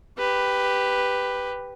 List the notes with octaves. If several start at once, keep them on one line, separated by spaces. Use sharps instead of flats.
G4 B4